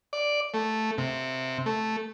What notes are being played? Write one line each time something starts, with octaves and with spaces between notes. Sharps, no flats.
D5
A3
C3
A3